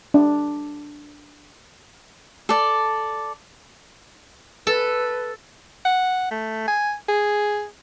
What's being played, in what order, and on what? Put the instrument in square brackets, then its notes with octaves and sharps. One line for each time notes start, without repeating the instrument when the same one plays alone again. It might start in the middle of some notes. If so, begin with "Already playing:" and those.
[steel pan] D4
[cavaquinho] A4 D5
[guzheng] A4 [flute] B4
[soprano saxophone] F#5
A3
G#5
G#4